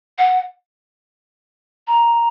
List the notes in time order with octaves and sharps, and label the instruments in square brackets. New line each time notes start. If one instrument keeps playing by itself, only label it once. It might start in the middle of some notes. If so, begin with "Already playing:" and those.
[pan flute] F#5
A#5